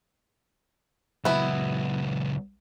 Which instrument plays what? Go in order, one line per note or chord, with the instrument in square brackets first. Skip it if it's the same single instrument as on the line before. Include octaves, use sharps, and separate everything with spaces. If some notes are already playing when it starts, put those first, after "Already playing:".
[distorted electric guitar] C#2 F#3 [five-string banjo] B3 E4